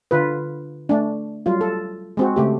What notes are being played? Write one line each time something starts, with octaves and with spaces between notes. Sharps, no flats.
D3 F4 B4
A3 D4
F#3 G3 F4
A4
G#3 C4 F#4
C#3 A3 G4